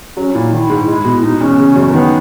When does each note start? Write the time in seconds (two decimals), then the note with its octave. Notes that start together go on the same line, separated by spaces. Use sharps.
0.17 F#3 C#4
0.34 A#2 E4
0.45 D#4
0.52 D#3 E4
0.70 G#2
0.88 G#3 E4
1.05 B2
1.23 B2 D#4
1.40 E2 C#4
1.59 C#3
1.76 F#2
1.89 A#3
1.93 D#3 B3